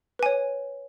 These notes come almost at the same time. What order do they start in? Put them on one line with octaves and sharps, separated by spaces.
B4 G#5 C#5